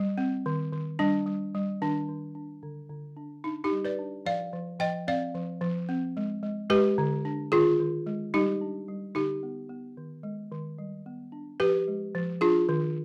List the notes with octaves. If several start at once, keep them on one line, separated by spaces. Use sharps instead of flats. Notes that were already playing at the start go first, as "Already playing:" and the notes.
Already playing: G3
C4
D#3
D#3
G3 D4
G3
G3
D#3 D4
D#3
D4
D3
D3
D4
D4 D#4
D#4 G4
G3
B4 D5
D4
F3 D5 F5
F3
F3 D#5 G5
C4 D5 F5
F3
F3
C4
G#3
G#3
G#3 G4 B4
D3
D4
D#3 F4 G#4
D#3
G#3
G3 D#4 G4
D4
G3
D3 D#4 G4
B3
B3
D#3
G#3
D#3
G3
B3
D4
F3 G4 B4
G#3
F3
D4 F4 G#4
D#3